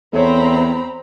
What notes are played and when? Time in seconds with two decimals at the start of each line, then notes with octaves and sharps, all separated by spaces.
0.13 E2 C4 A4 C#5 A#5 B5